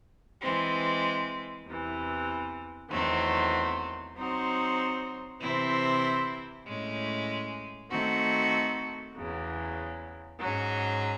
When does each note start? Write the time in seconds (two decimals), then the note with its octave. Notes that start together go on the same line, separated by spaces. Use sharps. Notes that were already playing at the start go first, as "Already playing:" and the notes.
0.41 E3 G#3 C4
1.66 E2 C3 E3
2.90 E2 D#3 F#3 A3 C4
4.15 F#3 C4 D#4 F#4 C5
5.41 C3 E3 C4 E4 C5
6.66 A2 G#3 C#4
7.90 D#3 A3 C4 F#4 A4
9.16 E2 C#3 F#3
10.41 G#2 F#3 C#4 G#4